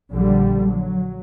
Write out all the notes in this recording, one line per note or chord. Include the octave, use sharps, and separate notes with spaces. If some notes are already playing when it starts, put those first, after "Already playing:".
A#1 D3 G3
F#3